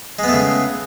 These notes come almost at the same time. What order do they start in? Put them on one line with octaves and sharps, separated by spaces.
G#3 B3 A3 C#3